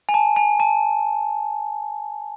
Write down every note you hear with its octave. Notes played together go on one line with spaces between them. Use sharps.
G#5
A5
G#5
A5